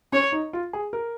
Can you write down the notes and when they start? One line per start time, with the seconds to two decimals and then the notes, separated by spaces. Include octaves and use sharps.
0.12 C#4 C#5
0.32 D#4
0.53 F4
0.73 G#4
0.93 A#4